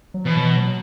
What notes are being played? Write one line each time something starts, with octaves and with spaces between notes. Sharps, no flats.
F#3
B2 E3
E3
F#3